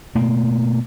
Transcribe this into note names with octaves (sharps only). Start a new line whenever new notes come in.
B2 A3 A#3